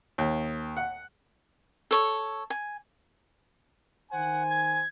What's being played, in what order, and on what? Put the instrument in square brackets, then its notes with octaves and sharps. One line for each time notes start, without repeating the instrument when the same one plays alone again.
[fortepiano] D#2
F#5
[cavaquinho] A4 C#5
G#5
[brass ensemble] D#3 C5 G#5 [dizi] F#5
[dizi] G#6